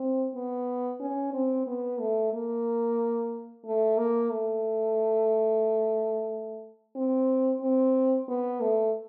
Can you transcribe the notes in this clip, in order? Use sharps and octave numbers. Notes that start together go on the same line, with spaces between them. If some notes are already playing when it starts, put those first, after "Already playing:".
Already playing: C4
B3
C#4
C4
B3
A3
A#3
A3
A#3
A3
C4
C4
B3
A3